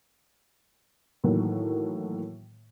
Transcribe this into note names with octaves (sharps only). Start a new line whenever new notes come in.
A2 D#3 E3 F#3 A#3